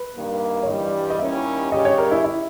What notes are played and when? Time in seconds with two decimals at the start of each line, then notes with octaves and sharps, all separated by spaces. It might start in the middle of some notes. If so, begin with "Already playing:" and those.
Already playing: B4
0.15 G2 D#3 A#3
0.63 C#5
0.67 G2 E3 G3 D#5
1.10 D#5
1.19 D#2 D#3 G3 C#4 E4 E5
1.71 C#3 G3 C#4 G4 D#5
1.85 C#5
1.98 A#4
2.11 E4
2.24 E4